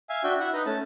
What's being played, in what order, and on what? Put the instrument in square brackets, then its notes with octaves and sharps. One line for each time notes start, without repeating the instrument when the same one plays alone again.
[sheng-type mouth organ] E5 F5 G#5
D4 F#4 E5 G5
E4 E5 F#5
D#4 B4 D#5
A3 C#4 A5